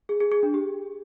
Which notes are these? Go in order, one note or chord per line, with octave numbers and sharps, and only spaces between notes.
G#4
G#4
G#4
D4
G4